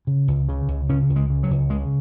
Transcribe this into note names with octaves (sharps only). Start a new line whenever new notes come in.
C#3
C#2
C#3
C#2
C#3 C#4
C#2
G#3
C#3
F#3
C#2
C#3 G#3